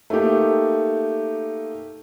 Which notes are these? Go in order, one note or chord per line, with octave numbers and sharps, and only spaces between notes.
A3 A#3 D#4 G4